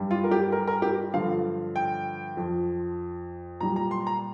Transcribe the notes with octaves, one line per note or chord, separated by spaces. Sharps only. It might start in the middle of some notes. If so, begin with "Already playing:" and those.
Already playing: G2 G3
F4
A#4
G4
A#4
A#4
G4
G2 D3 F3 F5
G5
F2 F3
A#2 G3 A#5
A#5
C6
A#5